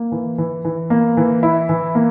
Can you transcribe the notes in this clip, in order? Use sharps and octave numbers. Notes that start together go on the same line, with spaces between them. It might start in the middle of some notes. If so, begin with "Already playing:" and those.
Already playing: A#3
E3
E3
E3
A#3
E3
E4
E3
A#3